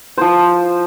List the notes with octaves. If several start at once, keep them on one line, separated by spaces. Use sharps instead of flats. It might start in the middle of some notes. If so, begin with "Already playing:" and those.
F3 C5